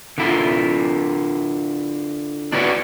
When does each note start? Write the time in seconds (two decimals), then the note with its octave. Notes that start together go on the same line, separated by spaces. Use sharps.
0.18 D3 E4 F4
2.52 D4 E4 F#4 B4 C#5